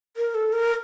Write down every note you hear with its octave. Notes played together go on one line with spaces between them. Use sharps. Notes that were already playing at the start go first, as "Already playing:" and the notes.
A#4
A4
A#4